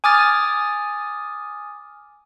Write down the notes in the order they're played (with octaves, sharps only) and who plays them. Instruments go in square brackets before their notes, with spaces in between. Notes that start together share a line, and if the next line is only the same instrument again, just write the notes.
[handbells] G#5 D6 D#6 F6 A6